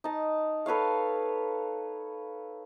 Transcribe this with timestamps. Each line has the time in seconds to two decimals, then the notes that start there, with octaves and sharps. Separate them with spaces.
0.04 D#4 A5
0.66 A4 B4 C#5 F5